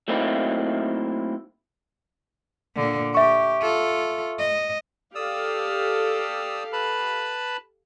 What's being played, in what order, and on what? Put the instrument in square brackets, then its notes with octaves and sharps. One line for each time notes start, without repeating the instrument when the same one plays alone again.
[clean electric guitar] F#3 A3 A#3 C4 D#4 E4
[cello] A#2 D3
[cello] G4 [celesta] E5 C#6
[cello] F4 A4
D#5
[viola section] G4 A4 F5 [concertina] D5 D#6 E6
[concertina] B4 A5 B5